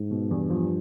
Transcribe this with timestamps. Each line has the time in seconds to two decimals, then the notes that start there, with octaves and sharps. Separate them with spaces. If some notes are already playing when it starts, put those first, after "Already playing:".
Already playing: G#2
0.10 B2
0.30 E2 G2
0.50 F3